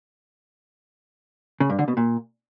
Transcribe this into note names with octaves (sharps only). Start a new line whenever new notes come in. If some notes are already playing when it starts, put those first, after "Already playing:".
C#3
G2
D3
B2
A#2